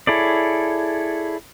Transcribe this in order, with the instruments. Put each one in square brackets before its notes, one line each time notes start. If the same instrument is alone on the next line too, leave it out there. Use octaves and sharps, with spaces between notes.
[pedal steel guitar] E4 G#4 A4 C#5 D5